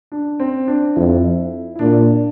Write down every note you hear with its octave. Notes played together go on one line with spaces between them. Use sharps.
D4
C4
D4
F2 E4
E4
A#2 D4